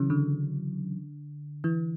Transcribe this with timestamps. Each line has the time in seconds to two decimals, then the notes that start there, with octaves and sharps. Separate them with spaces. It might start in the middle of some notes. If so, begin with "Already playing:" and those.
Already playing: C#3 E3 F#3
0.10 D3
1.64 E3